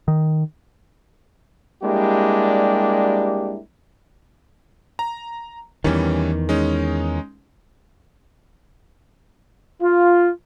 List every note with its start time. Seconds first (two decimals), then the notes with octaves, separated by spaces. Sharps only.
0.08 D#3
1.82 G3 G#3 A#3 D4 E4 G4
4.99 A#5
5.84 E2 D#3 E3 G3 C#4
6.49 G#3 C#4 D#4
9.82 F4